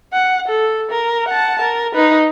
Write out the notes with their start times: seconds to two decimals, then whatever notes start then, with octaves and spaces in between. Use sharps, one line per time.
0.13 F#5
0.48 A4
0.91 A#4
1.29 F#5 A5
1.62 A#4
1.94 D#4 B4